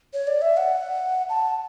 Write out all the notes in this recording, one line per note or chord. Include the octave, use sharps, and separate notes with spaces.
C#5
D5
E5
F#5
A5